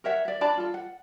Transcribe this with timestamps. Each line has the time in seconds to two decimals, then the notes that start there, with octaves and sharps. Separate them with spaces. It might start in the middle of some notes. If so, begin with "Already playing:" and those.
0.04 A#4 C#5 E5 F#5
0.25 D5 E5
0.41 D4 D5 A5 B5
0.57 F4 A4
0.74 F#5